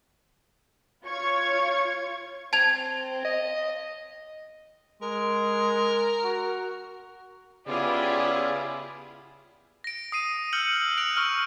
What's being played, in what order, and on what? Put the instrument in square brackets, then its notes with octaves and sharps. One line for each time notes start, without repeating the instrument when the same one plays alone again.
[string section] F4 C#5 C#6 G#6
[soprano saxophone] C4 [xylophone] A5 G#6 F7
[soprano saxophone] D#5
[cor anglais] G#3 [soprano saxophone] A#4
[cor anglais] F#4
[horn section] C#3 B3 E4 [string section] F4 G4 G#4 [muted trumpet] D5
[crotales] A#6 D7
D#6 C7 D#7
E6 F6 G6 C#7 D#7 F#7
F#6 A#6 D7 F7
C#6 E6 F6